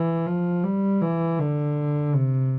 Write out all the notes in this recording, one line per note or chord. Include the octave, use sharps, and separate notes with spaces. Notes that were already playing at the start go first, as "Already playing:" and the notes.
Already playing: E3
F3
G3
E3
D3
C3